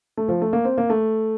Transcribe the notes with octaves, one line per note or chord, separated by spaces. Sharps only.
A3
F3
A3
A#3
C4
A#3
A3